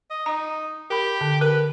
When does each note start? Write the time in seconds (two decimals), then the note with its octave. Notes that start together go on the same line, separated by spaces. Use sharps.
0.10 D#5
0.26 D#4 A#5
0.90 G4 A#4 B5
1.21 D3
1.41 A#4 B4